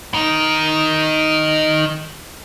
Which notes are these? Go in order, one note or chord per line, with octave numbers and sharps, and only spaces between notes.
D#3 D#4